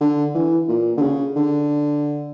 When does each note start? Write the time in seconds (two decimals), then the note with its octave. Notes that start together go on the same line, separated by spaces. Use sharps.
0.01 D3
0.35 E3
0.69 A#2
0.97 D3
1.02 C#3
1.36 D3